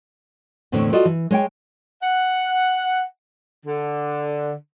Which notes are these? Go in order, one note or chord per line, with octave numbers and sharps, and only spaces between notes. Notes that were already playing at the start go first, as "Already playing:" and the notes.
E2 A2 D3 C4 D4 C#5
F4 F#4 A4 D5 D#5
E3
G#3 C#5 G5
F#5
D3